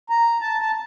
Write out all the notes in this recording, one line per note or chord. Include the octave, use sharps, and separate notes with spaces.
A#5
A5
A5